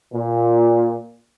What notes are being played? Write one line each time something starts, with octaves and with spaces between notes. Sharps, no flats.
A#2